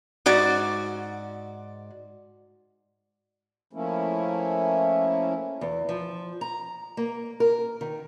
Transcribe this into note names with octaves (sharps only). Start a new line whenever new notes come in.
G#2 F#4 D5
F3 A3 A#3 C#4 E4
E2
F3
A#5
A#3
A#4
D#3